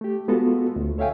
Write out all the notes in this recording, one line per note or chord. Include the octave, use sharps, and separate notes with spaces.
A3 G4
G#3 B3 F4 F#4 A4
D2 A3
A4 C#5 E5 F5 G5 G#5